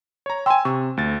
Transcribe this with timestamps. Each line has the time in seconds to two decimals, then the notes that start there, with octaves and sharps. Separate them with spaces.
0.26 C#5 A#5
0.46 G5 G#5 C6 E6
0.65 C3 C#6
0.97 D2 A6